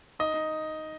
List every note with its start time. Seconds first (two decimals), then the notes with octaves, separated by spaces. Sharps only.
0.19 D#4 D#5
0.34 D#4